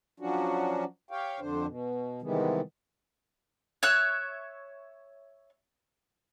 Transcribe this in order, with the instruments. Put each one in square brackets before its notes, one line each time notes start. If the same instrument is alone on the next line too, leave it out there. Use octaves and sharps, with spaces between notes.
[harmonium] F3 F#3 C#4 D4 F#4
G4 C#5 F5 G5
F2 D3 D4 C5
B2
C3 D#3 E3 G3 G#3 B3
[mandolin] C#5 E5 F#6